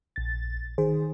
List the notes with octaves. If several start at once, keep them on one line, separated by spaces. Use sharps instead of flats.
A#1 A6
D#3 G#4 C5